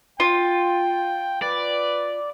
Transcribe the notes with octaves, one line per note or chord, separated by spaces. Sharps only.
F4 G5
B4 D5